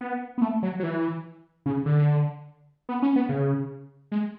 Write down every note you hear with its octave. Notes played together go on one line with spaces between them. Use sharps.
B3
B3
A3
F#3
F#3
E3
C#3
D3
B3
C#4
B3
C#3
G#3